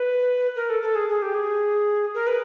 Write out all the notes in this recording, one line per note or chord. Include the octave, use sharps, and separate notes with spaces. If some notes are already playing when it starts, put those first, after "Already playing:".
Already playing: B4
A#4
A4
A4
G#4
G#4
G4
G#4
A#4
B4